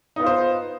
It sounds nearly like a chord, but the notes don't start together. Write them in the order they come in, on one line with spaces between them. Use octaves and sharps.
D#4 B3 F4 C5